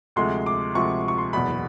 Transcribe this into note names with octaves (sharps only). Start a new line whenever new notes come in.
D2 C3 F3 G#3 C6
D6
D2 C3 F3 G#3 C#6
C#6
C6
F#1 E2 B2 B5